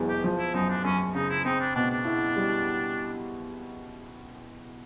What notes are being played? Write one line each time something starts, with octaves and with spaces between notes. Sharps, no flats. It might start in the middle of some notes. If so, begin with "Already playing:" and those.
Already playing: E1 E2 B2 F#3
G4
F3
E4
F#2 D#4
D4
F#2 C#4
C#3 D#4
E4
C4 D#4
D4
B2 D4
D4
E4
G3